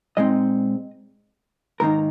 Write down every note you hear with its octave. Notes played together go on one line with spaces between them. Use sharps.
A#2 G#3 C4 D#4 D#5
G#2 D#3 A#3 D#4 A#4